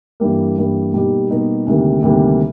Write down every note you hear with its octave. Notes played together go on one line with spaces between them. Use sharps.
G2 E3 G3 A#3
G2 E3 G3 A#3
B2 G3 A#3 D#4 G4
B2 G3 A#3 D#4 G4
D2 C3 D#3 G3 A#3
D2 C3 D#3 G3 A#3